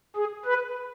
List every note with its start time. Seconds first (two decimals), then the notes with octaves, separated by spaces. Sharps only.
0.16 G#4
0.45 B4